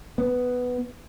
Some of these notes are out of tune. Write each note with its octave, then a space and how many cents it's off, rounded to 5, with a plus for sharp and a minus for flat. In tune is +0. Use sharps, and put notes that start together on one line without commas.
B3 +5